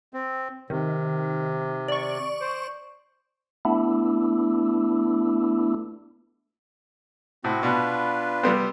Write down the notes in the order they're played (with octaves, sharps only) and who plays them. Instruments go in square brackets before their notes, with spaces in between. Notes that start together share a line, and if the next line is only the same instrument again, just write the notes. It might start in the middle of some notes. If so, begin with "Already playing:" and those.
[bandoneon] C4
[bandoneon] C3 [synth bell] D#3
[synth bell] D5 C#6
[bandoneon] C5
[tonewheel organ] A3 B3 D4 E4
[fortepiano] A2 [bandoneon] C4 F#4
[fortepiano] B2 [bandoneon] D4 F4 B4
[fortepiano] G3 B3 C4